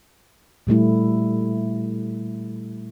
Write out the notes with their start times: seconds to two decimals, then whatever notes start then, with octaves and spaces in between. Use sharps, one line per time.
0.67 A#2 G3 A3 E4